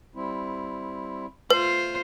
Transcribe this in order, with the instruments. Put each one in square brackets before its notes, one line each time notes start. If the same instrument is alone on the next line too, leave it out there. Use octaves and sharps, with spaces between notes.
[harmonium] G3 C4 E4
[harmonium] A3 [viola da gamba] F4 C5 [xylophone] B4